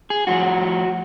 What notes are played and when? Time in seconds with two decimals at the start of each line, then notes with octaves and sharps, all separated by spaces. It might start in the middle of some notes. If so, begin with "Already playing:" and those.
0.10 G#4
0.27 A2 F3 F#4